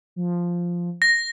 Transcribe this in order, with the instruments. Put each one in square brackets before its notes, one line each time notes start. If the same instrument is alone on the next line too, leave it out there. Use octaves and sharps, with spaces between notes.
[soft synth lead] F3
[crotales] A#6